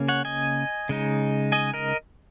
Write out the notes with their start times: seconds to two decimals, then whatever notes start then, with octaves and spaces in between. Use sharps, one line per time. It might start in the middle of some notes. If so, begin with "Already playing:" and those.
Already playing: C#3 A#3 C#4
0.08 C#5 F#5
0.25 D#5 G#5
0.89 C#3 G#3 D#4
1.52 D#5 G#5
1.74 A#4 D#5